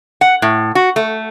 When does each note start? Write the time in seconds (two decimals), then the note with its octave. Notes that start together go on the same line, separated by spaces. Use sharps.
0.21 F#5
0.42 A2
0.75 F#4
0.96 A3